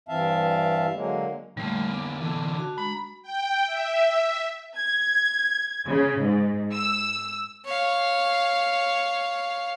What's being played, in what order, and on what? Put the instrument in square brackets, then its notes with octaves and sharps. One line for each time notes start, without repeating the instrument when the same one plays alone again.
[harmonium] G2 E3 C4 E5 F5 A5
D3 F#3 G#3 A#3
[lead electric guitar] D3 A#3 [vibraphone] G3 A3
[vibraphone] B3 D6
[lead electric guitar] D3 E3
[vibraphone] D4 F#4 A5
[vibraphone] G#3 A#5 [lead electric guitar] B5
[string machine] G5
E5
[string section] G#6
C#3
G#2
E6
[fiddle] C#5 F5